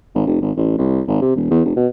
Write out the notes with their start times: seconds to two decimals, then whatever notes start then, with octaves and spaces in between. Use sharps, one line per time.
0.15 G#1
0.27 F1
0.42 G#1
0.57 A1
0.78 C2
1.08 G#1
1.22 C3
1.36 E1
1.51 E2
1.65 F1
1.77 B2